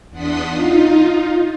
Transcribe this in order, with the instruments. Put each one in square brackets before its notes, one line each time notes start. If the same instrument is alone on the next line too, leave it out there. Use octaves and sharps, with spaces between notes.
[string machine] E2 D4 F#5 C6 D#6 B6
D#4 F4